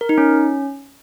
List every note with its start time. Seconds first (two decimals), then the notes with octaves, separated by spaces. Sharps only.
0.01 A#4
0.09 D#4
0.18 C#4